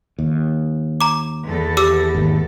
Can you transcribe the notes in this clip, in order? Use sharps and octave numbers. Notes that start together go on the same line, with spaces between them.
D#2
A#5 D6
E2 A4
G4 D6 E6
G#1 D#2